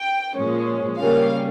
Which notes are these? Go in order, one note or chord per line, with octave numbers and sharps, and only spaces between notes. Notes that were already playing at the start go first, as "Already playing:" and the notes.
Already playing: G5
A#2 F3 G#3 C#4
C#3 G3 A#3 C#4 F5